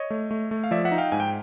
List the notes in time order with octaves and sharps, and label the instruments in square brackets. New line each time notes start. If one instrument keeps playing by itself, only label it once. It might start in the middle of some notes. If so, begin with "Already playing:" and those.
Already playing: [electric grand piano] C#5 D#5
A3
A3
A3
F5
F3 D5 E5
E5 F#5
D#4
F5 G5
G#2 G#5
G5